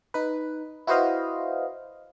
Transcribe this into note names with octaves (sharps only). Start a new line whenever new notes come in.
D#4 B4
E4 F#4 B4 C5 D#5 F5